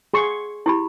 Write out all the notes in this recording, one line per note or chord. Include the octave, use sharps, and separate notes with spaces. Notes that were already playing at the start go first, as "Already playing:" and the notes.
G#4 C6 C#6
E4 G4 B5